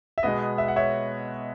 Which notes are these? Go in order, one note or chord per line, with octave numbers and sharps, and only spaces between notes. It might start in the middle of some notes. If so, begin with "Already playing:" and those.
E5
B2 G#3 B3 D#5
E5
F#5
C#5 E5